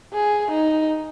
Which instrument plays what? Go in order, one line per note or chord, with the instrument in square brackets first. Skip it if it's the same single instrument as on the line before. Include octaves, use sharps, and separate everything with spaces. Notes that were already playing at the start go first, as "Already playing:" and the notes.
[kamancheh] G#4
D#4